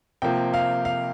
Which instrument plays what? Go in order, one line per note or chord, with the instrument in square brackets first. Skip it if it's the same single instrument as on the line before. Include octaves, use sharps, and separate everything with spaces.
[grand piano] C3 F3 A#3 G5
F5
F5